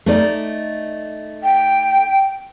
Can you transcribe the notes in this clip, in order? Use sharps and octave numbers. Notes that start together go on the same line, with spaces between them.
A3 D#4 D5
G5